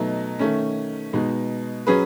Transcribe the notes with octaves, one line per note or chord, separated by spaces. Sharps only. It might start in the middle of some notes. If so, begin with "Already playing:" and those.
Already playing: B2 F#3 A3 D#4
D#3 A3 C#4
B2 G#3 D#4
F#3 C#4 G#4 B4